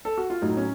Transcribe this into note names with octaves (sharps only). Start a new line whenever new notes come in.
A4
F#4
F4
A2 F#3 D#4
C#4